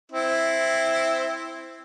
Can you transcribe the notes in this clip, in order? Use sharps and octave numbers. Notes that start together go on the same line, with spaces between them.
C4 E4